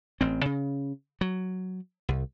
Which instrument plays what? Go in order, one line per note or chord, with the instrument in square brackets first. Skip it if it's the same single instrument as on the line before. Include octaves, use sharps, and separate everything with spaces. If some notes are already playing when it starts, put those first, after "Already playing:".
[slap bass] A1 C4
C#3
F#3
C2